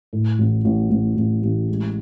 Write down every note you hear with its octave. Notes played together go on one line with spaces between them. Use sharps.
A2
A1
A1
A1
A1
A1
G#3